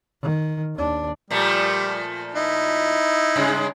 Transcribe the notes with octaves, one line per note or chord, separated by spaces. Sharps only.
D#3
D#2 D4
A#2 F3 G3 A3
D#4 E4
G2 C#3 G#3